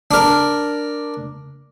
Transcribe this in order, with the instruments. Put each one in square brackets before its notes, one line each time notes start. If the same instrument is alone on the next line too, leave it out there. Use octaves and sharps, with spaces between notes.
[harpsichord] D4 A#4